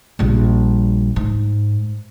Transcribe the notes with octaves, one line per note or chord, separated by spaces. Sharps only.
A#1 G3
G#2